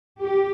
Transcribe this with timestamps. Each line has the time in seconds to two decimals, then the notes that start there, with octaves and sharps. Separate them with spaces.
0.22 G4